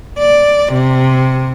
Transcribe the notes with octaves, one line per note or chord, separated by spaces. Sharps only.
D5
C3